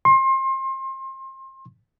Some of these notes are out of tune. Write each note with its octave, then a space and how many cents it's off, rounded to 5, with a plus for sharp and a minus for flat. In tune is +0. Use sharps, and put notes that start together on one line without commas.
C6 +30